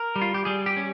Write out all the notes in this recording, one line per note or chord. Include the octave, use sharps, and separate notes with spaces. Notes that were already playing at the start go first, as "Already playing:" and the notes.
Already playing: A#4
G3
F4
G4
G3 G#4
G4
C#4